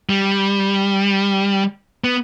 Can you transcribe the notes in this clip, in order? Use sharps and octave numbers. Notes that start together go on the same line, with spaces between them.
G3
B3